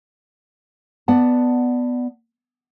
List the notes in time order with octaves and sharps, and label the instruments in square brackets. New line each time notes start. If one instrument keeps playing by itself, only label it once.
[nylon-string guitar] B3 D5 F#5 A5